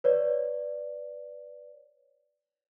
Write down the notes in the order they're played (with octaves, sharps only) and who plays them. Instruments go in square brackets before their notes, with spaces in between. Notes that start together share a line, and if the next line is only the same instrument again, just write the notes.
[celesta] B4 C#5 D5